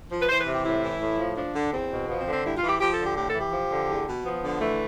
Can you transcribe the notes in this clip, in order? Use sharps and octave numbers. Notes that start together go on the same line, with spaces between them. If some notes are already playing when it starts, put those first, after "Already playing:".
F3
B4
E3 C5
B4
C3
G4
A2 E4
E3
A2
F3
F3 D4
D3
E2 C4
B2
F3 B3
C4
D3
C4
G2 E4
F4
E3
G4
F3 G4
A4
D3
G4
A2 G4
A4
E3
G4
F3
D3
E2
B2
F3 B3
D3
E3 A3